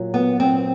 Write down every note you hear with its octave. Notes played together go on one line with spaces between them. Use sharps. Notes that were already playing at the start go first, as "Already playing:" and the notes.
Already playing: A#2 F#3
B3
C4